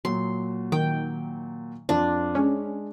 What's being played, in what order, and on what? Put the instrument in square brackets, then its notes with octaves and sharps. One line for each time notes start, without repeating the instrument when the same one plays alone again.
[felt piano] A#2 F#3 [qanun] C6
[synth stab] D#3 [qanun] G5
[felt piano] F2 F4 D6 [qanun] D4
[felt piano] G#3 [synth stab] C#4